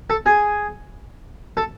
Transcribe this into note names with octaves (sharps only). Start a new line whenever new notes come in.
A4 A5
G#4 G#5
A4 A5